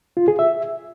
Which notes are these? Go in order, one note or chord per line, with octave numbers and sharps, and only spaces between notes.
F4
G#4
E5